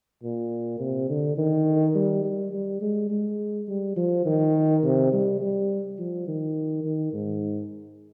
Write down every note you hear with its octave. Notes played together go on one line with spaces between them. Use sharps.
A#2
C3
D3
D#3
G3
G3
G3
G#3
G#3
G3
F3
D#3
C3
G3
G3
F3
D#3
D#3
G#2